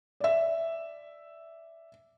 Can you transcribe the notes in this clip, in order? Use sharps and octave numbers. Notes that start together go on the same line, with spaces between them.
D5 E5